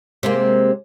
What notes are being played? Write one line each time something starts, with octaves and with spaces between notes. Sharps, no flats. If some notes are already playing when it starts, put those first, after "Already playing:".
C3 G#3 A#3